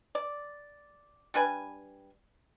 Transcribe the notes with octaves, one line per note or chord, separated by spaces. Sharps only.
D5
G3 D4 B4 G#5